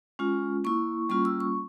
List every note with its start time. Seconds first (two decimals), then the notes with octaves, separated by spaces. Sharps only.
0.19 G#3 C#4 F4
0.64 A#3 E4 C#6
1.09 G3 A#3 C#4 F4 C#6
1.25 E6
1.40 C#6